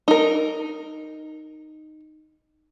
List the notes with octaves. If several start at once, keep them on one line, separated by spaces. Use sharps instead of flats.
D#4 A#4